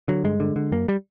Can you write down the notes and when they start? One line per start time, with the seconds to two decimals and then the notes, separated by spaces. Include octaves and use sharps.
0.08 D3 F#3
0.24 G2 G#3
0.40 D3
0.56 D3
0.72 F#2 A#3
0.88 G3